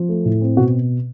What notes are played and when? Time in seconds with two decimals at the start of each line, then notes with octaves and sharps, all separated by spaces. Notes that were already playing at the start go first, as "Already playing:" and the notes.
Already playing: F3
0.09 A3
0.25 A2
0.41 C4
0.57 B2 F#4